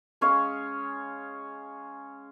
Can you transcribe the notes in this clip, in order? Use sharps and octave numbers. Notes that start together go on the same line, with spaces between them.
G#3 C#4 C#5 F5